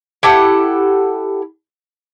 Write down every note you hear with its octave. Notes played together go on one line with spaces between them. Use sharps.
E4 G4 A4 F#5